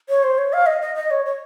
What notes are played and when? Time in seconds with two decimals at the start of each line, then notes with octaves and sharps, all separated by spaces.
0.09 C#5
0.23 C5
0.38 C#5
0.53 F5
0.66 D#5
0.81 D#5
0.95 D#5
1.11 C#5
1.25 C#5